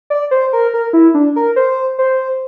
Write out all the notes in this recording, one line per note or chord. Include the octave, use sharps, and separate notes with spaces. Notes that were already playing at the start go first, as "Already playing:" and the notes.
D5
C5
A#4
A#4
E4
D4
A#4
C5
C5